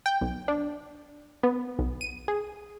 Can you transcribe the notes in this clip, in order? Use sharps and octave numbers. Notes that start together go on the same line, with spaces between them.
G5
B1
D4
B3
B1
D#7
G#4